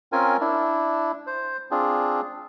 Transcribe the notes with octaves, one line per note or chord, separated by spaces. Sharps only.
C4 C#4 F4 A#4 G#5
D4 E4
C5
C4 D4 F4 G#4